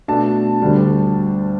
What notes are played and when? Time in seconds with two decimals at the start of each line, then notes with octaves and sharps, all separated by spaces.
0.08 B2 A3 D4 A5
0.62 D2 D3 G3 D4